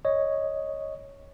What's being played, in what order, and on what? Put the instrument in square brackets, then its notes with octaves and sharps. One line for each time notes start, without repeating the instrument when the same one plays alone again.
[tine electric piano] C#5 D#5